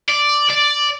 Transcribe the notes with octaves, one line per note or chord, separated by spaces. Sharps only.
D5
D5